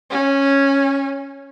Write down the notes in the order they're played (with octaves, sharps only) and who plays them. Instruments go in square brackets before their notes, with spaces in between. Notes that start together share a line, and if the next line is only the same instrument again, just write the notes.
[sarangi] C#4